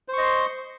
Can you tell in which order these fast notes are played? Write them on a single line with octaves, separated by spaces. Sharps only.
C5 C#6 D#5 C6